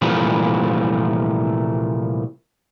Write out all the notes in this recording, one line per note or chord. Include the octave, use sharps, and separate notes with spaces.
C2 A#2 E3 F3 G3 A3